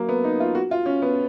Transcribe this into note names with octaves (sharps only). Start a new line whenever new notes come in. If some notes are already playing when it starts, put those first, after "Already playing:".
Already playing: F#3 A#3
B3
D#4
F4
F#4
F4
C#4
B3